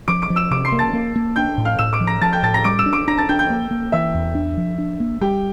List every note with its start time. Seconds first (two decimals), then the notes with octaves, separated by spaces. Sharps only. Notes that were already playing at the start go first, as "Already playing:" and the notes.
0.08 F3 D6 D7
0.22 D6 D7
0.30 F3
0.36 E6 E7
0.51 C3 D6 D7
0.65 C6 C7
0.72 A#3
0.79 A5 A6
0.93 A#3
1.16 A#3
1.36 D4 G5 G6
1.58 A2
1.65 F5 F6
1.79 A2 E6 E7
1.93 D6 D7
2.01 F3
2.07 A#5 A#6
2.21 F3 A5 A6
2.33 G5 G6
2.43 A2 A5 A6
2.54 A#5 A#6
2.64 G3 D6 D7
2.79 E6 E7
2.86 D4
2.93 D6 D7
3.08 D4 A#5 A#6
3.17 A5 A6
3.29 D4 G5 G6
3.39 G5 G6
3.50 A#3
3.71 A#3
3.92 E3 E5 E6
4.14 E2
4.35 D4
4.57 F3
4.78 D4
5.00 A#3
5.21 G3 G4 G5